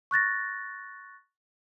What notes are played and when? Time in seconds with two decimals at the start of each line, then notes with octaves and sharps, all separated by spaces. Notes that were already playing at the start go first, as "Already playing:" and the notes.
0.11 C#6 F#6 A6 A#6